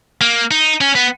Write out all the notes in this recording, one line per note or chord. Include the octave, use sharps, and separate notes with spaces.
A#3
D#4
C#4
B3